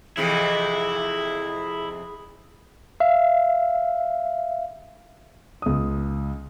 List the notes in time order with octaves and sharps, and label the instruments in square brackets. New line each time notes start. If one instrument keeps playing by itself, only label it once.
[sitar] F2 C3 E3 [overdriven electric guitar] E4 [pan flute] G#4
[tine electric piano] E5 F5
[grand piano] C#2 D#6